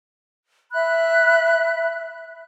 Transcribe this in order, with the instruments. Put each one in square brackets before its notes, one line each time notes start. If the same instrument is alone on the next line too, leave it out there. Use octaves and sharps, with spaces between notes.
[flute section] E5 B5 F#6